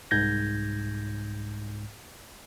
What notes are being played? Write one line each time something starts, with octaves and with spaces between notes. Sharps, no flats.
C2 G#2 G6 G#6 A#6